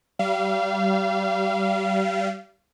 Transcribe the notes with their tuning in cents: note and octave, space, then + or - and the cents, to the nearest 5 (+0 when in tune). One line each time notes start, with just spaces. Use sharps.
G3 -25 F5 -30